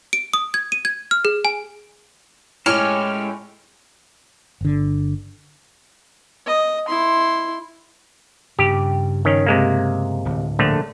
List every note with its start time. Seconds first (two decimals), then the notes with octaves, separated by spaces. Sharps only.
0.13 D7
0.34 D#6
0.54 G#6
0.72 D#7
0.85 G#6
1.11 F6
1.25 G#4
1.45 G#5
2.66 A2 G#3 C#4 G4 A4 F6
4.61 G1 D3
6.46 D#5
6.88 E4 C6
8.59 G2 C#3 G4
9.25 D#3 C#4
9.46 C3 G#3 A#3
10.25 D1
10.59 A#1 D3 A3